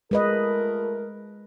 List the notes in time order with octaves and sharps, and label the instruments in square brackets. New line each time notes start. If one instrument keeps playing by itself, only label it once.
[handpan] G#3 B4 D#5 [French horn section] A3 F4 A#4